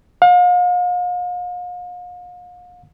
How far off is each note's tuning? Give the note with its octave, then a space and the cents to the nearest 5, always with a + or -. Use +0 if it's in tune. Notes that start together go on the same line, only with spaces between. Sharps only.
F5 +40